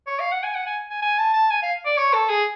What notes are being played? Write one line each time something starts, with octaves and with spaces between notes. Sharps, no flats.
C#5
F5
F#5
G#5
F#5
G#5
G#5
G#5
A5
A5
G#5
F5
D5
C#5
A4
G#4